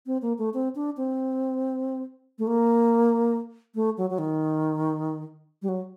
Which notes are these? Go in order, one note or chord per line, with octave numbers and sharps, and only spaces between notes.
C4
A#3
A3
C4
D4
C4
A3
A#3
A3
F#3
F#3
D#3
G3
F#3